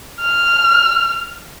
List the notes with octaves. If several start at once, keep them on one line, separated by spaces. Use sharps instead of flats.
F6